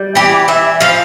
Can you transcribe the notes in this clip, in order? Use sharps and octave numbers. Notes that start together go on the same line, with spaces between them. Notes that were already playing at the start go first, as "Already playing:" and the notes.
Already playing: G3
E3 G4
E3 E5
F3 F5